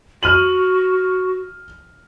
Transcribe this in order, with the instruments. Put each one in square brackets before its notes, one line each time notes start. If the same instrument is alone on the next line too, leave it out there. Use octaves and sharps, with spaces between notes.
[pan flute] F#4 [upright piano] F6 D#7 F#7